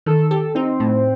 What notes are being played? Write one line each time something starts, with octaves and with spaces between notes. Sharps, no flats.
D#3 A4
G4 A4
C4 D#4
A2